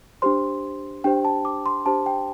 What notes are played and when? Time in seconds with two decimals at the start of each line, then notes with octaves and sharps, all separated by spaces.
0.22 D4 G4 C5 C6
1.04 D4 G4 C5 G5
1.25 A5
1.45 D6
1.66 C6
1.86 D4 G4 C5 A5
2.06 G5